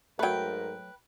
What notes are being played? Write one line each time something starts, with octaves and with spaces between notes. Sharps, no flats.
G#2 F#3 A3 A#4 B4 G5